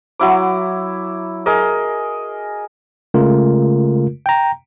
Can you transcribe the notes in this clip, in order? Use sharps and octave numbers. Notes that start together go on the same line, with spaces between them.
F#3 E4 D6
G#4 A#4 D#5
C#3 G#3 A3 F4 A#4
G5 A#5